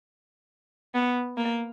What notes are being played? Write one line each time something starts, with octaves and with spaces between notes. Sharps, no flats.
B3
A#3